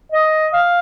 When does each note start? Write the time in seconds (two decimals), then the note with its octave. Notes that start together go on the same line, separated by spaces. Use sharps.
0.12 D#5
0.53 F5